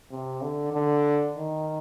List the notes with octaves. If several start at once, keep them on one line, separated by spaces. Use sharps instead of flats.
C3
D3
D3
D#3